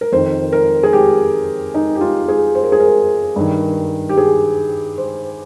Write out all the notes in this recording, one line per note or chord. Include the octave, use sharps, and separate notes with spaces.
A#4
F2 D#3 C5
A#4
G#4
G4
D#4
G4
F4
G#4
C5
A#4
G#4
A#4
G2 D#3
G4
G#4
C5